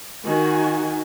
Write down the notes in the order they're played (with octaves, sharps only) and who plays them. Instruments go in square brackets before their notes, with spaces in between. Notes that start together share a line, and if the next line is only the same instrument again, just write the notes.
[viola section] D#3 F#4 G#5